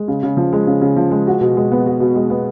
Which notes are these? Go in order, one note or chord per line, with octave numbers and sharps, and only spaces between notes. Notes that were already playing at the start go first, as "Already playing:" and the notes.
Already playing: G#3
C#3
C#3
F3
G#3
C#3
C#3
F3
G#3
F#4
B2
G#3
B3
F#4
B2
G#3
B3